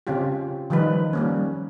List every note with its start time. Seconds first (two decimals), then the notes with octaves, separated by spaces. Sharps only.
0.07 C#3 C4 C#4 F4 G4
0.70 D#3 F3 G3 D#4 B4
1.13 G3 A#3 C#4